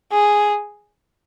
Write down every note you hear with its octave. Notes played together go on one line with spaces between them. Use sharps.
G#4